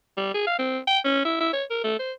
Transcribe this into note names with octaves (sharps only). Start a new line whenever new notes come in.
G3
G#4
F5
C4
G5
C#4
E4
E4
C#5
A#4
A3
C5